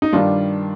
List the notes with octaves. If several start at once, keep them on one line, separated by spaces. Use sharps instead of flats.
D#4
G2 D#3 G3 D4 F4